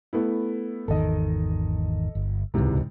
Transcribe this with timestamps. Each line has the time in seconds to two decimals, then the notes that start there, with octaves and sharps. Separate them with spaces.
0.13 A3 B3 E4
0.88 G#1 E2 D#3 A4 D#5
2.15 G1
2.54 D#1 C#2 G#2 C3 E3